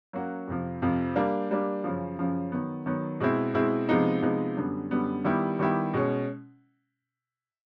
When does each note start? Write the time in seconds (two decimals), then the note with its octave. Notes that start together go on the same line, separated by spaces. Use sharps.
0.13 F#3 A#3 C#4 F#4
0.48 F2 C3 F3
0.82 F2 C3 F3
1.15 G3 A#3 D4
1.51 G3 A#3 D4
1.84 F#2 C#3 F3
2.19 F#2 C#3 F3
2.52 D#3 F#3 B3
2.86 D#3 F#3 B3
3.20 B2 G#3 C4 E4
3.54 B2 G#3 C4 E4
3.89 C3 F3 G#3 B3 D#4
4.22 C3 F3 G#3 B3 D#4
4.57 F#2 D3 G3 B3
4.91 F#2 D3 G3 B3
5.24 D#3 G3 B3 E4 G4
5.59 D#3 G3 B3 E4 G4
5.94 B2 G#3 C#4